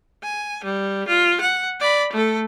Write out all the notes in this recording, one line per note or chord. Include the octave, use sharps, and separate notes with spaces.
G#5
G3
F4
F#5
D5 B5
A3 A4